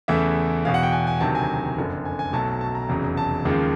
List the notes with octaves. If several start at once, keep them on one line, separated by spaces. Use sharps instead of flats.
E2 C#3 E3 A3 E5
E1 E2 B2 F5
F#5
G5
G#5
G#5
D2 C3 D#3 F#3 A5
G#5
F#1 F2 D3
G#5
G#5
B1 B2 F#3 A3 A5
A5
A#5
F1 E2 C#3 F#3
A5
D#2 C#3 F3 G#3